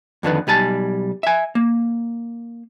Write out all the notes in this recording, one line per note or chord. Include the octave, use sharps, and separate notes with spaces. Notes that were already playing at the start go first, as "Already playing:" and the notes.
F2 D3 D#3 B4
B1 G3 G#5 A5
E5 G#5
A#3